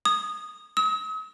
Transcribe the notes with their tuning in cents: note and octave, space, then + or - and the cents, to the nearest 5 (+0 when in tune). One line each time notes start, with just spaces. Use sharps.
D#6 -15
D#6 +45